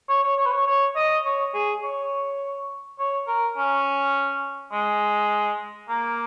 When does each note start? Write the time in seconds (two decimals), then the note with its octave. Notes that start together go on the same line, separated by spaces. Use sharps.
0.09 C#5
0.23 C#5
0.37 C#5
0.46 B4
0.52 C#5
0.67 C#5
0.96 D#5
1.25 C#5
1.54 G#4
1.83 C#5
2.99 C#5
3.27 A#4
3.57 C#4
4.72 G#3
5.89 A#3